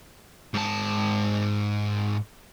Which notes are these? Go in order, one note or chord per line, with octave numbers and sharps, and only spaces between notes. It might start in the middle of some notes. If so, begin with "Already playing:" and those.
G#2 A5